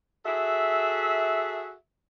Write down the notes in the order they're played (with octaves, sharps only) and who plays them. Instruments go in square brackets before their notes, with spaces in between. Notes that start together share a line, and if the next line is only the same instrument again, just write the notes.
[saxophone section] F#4 G#4 A4 E5